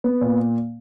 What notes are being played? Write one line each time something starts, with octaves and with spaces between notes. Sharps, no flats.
B3
A#2